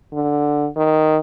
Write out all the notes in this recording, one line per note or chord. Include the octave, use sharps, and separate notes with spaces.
D3
D#3